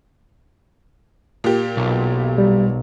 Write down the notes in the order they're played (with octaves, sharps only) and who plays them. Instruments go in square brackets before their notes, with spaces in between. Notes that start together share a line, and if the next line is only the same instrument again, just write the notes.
[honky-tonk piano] A#2 G4
[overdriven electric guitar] B1
[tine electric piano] G3